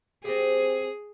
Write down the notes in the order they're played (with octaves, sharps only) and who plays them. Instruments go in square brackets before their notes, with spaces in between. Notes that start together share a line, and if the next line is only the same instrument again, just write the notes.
[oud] C4 G4 [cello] G#4